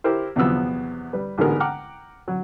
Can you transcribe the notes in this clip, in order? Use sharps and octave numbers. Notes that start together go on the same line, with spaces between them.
E4 G4 A#4 C5
E2 C3 F3 F#3 B3 E6
G3 B4
A1 G#2 D3 G#3 B3 A#4
F#5 G5 A#5 D6 F6
F#3